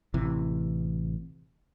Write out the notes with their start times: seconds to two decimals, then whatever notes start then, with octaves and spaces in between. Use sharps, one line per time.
0.14 A1 C3 E3